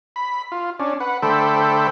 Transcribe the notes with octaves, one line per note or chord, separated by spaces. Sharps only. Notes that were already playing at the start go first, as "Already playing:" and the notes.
B5
F4
C#4 D4
B4 F#5
D3 A3 A4 C5 G5 B5